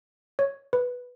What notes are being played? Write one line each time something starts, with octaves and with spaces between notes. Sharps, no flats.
C#5
B4